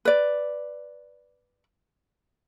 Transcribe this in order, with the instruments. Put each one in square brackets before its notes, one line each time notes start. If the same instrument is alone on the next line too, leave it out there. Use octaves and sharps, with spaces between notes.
[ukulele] B4 D5